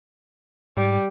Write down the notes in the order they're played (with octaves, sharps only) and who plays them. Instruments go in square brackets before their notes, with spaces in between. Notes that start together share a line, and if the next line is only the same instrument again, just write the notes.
[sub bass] G#2 [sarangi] G3